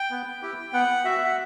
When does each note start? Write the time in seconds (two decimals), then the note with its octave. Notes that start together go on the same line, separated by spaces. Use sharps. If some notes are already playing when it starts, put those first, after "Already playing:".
Already playing: G5
0.11 B3
0.42 E4 G4
0.73 B3 F#5
1.05 F#4 E5
1.25 F#5